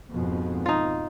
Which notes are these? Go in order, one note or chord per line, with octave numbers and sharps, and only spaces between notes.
F2 G#2 B2
D#4 F4